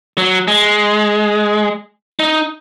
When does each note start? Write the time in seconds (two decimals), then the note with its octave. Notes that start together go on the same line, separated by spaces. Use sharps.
0.18 F#3
0.48 G#3
2.20 D#4